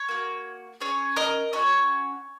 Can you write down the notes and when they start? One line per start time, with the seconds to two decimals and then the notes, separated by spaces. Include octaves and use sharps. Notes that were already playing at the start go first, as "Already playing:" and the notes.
Already playing: C#5
0.08 A#3 F#4
0.81 C#4 G#4 C#5
1.16 A#4 D#5
1.53 C#4 F#4 C#5